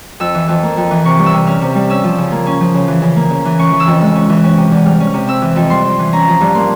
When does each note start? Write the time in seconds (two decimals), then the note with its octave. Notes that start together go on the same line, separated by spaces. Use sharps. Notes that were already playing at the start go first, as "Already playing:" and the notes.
0.20 F2 E6
0.35 E3
0.48 F2
0.63 A#3
0.77 F2
0.91 E3
1.04 C3 C#6
1.19 G3
1.26 E6
1.34 C3
1.47 C#4 F6
1.61 C3
1.75 G3
1.90 C#4 E6
2.04 F3
2.18 C#3
2.32 A#3
2.47 C#4
2.61 F3
2.74 C#3
2.88 E3
3.02 C#3
3.16 A#3
3.31 C#3
3.45 E3
3.59 C#4 C#6
3.72 E3
3.80 E6
3.87 F2
4.01 G#3 E6
4.15 C#4
4.29 E3
4.44 C#4
4.57 C3
4.71 E2
4.85 G3 F6
5.00 C#4
5.07 F6
5.14 C3
5.27 C4 E6
5.42 E3
5.56 F2
5.70 G3 C6
5.85 C4
5.99 E3
6.13 C#4 A#5
6.27 F3
6.41 G2
6.55 A#3 C6